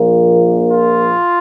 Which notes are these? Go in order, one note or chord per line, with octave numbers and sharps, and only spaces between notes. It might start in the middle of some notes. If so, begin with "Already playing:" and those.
Already playing: A#1 A#2 F3 A#3
F4